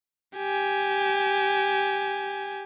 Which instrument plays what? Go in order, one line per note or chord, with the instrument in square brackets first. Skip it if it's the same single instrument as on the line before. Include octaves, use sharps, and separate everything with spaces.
[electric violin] G4 G#5